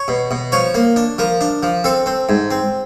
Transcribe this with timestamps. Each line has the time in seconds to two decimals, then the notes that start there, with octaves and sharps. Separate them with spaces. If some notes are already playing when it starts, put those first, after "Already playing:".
Already playing: C#5
0.08 B2
0.31 B2
0.52 F3 C#5
0.75 A#3
0.96 D4
1.18 F3 A#4
1.41 D4
1.63 F3
1.84 C4 A4
2.06 C4
2.29 G#2
2.51 C4